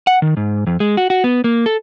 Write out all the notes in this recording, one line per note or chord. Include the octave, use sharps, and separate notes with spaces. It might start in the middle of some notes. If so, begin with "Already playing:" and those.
F#5
D#3
G#2
F2
G#3
F#4
F#4
B3
A#3
A4